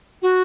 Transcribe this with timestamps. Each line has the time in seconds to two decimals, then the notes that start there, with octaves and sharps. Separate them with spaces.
0.22 F#4